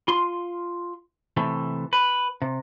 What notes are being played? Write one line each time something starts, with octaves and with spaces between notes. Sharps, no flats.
F4 C6
C3 E3 A3
B4
C3